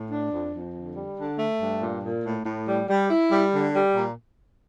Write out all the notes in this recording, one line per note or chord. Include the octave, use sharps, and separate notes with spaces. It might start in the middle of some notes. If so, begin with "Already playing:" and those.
Already playing: A2
D4
F2
F2
D3
G3
D3
A3
G2
A#2
A#2
A2
A2
G3
G3
E4
G3
D3
G3
A#2